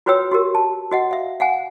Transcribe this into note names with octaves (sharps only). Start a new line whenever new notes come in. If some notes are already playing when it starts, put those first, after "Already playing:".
F4 F#4 B4 C#5 G5 E6
F#4 G4 A#4
A5
F#4 D#5 F#5
E5 F5
F5 F#5 G#5